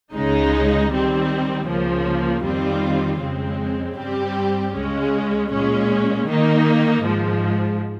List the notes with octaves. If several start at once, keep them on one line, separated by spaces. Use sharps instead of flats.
C#2 C#3 G#3 D#4
D#3 G3 C4
C#2 C#3 F3 A#3
F2 D#3 G3 C4 F4
F2 C#3 G#3 C4
G2 G3 C4 G4
C#2 C#3 G#3 C#4
A#2 G#3 C#4
D#3 A#3 D#4
G#2 F3 G#3